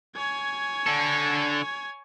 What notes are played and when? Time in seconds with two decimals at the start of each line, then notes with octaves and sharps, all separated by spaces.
0.16 C#5 G#5
0.86 D3 A4